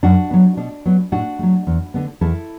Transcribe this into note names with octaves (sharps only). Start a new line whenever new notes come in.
F#2 D4 F#4
F#3 B3
B2 D4
F#3 B3
A2 D4 F#4
F#3 A3
E2
D3 B3
E2 E4 A4